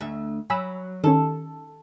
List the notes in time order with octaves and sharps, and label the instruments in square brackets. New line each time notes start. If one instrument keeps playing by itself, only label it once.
[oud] D2 E5
[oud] F#3 [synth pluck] G#5 B5 E6
[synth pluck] D#3 C#4 [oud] A4